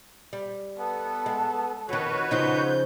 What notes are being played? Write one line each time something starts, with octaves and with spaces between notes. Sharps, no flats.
G3
B3 A4
G#3
F2 D#3 F#4 B4 C#5
C#3 F3 D#4 G6